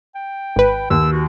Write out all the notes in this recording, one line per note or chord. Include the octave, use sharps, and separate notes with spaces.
G5
G#1 B4
D#2 E6
F#4